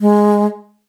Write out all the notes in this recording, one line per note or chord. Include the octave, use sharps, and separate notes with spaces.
G#3